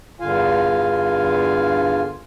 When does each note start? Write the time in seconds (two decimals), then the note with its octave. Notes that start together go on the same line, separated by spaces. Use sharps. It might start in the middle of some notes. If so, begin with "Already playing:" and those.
0.20 E2 G2 D3 F4 F5 G#5